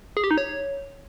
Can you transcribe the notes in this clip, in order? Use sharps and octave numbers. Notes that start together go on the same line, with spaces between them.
G#4
G4
D#4
C#5